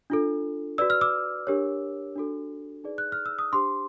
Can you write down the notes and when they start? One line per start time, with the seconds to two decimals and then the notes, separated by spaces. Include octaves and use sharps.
0.10 D4 F4 A4
0.78 F#4 B4 D5 E6
0.90 F6
1.01 D6 E6
1.47 D4 G4 A#4 C#5
2.16 D4 F#4 A4
2.84 D#4 G#4 B4 D5
2.98 F#6
3.12 F6
3.26 E6
3.39 D#6
3.52 D4 G4 C5 C6 D6